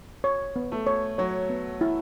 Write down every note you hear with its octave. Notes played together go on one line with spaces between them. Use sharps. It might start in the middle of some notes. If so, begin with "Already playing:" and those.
C#5
B3
A3
C#5
F#3 C#5
B3
E4